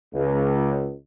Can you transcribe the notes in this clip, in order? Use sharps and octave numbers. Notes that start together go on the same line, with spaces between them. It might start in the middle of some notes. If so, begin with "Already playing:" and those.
C#2